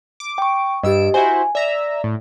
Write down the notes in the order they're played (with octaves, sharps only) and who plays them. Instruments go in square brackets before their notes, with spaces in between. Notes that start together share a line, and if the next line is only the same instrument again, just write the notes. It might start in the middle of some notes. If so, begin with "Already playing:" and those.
[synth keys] D6
[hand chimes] G5 C#6
[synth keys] G2 E6 D7 [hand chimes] G4 D#5
[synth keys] E4 F#4 C5 [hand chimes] G#5
[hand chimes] D5 [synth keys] E5 A#5 E6
[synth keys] A2